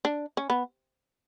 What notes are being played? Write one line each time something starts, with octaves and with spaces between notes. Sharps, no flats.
D4
C#4
B3